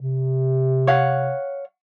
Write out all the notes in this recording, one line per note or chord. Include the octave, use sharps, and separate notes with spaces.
C3
C#5 F5 F#5